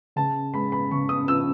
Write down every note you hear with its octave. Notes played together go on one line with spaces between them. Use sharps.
C#3 A5
G#3 B5
B5
C#3 C#6
D#6
F3 E6